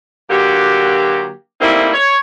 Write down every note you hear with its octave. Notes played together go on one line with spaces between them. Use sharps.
D3 F#3 A#3 F#4 G4
G3 A3 A#3 C4 D#4 E4
C#5